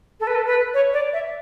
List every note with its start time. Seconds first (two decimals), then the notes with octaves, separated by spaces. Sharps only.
0.20 A4
0.27 B4
0.35 A4
0.47 B4
0.74 C#5
0.93 D5
1.13 E5